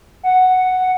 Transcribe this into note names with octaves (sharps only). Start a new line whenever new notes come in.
F#5